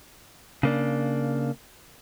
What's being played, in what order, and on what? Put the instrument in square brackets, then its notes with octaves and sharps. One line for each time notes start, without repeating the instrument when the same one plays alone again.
[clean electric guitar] C#3 A#3 D4